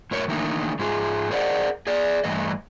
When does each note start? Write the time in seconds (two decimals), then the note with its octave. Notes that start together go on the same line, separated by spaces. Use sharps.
0.11 A2 F#3 A#4 C#5
0.28 D#3 E3 A3 A#3 D4 D#4
0.79 G#2 G#3 F4 G#4
1.31 G#4 A#4 C5 D5 D#5 F#5
1.87 G#4 D5
2.24 G2 E3 A3 B4 D#5